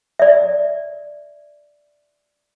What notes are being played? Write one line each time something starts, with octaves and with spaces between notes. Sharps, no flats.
D5 E5